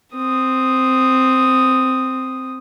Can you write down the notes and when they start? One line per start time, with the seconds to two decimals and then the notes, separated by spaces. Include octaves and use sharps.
0.16 C4 D#6